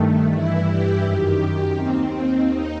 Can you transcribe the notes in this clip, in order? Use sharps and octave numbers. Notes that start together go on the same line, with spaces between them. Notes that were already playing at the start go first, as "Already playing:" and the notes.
Already playing: G2 D#3 A3
G2 E3 E4
G4
F#2 D#3 G4
D#2 D#3 C4
C4
D#2 D#4